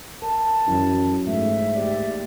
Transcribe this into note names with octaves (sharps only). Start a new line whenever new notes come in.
A#4 A5
F#2 E3 F#3 E4
G#2 A3 E5
A#3 G4 D5